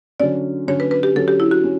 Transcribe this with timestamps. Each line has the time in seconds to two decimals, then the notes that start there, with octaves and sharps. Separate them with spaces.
0.20 D3 F#3 C#4 D5
0.68 D3 F#3 C#4 C#5
0.80 B4
0.91 B4
1.03 G4
1.16 D3 F#3 C#4 A4
1.28 G4
1.40 E4
1.51 F#4
1.64 C#4